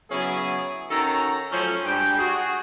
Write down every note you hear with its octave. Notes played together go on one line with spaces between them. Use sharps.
C#3 F#3 B3 C#4 E4 G#4
D#3 C#4 F#4 A4 A#5
F3 F#3 A3 C#4
G2 G3 G#3 G5
F#4 G#4